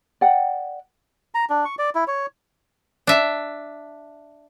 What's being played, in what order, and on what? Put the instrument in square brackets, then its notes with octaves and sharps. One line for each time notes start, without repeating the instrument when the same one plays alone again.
[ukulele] D5 F#5 G5
[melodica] A#5
D4
C#6
D5
E4
C#5
[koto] D4 E5